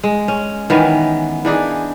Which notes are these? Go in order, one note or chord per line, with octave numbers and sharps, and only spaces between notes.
G#3
C#4
D#3 E3 B3 C#4
E3 D4 D#4 G#4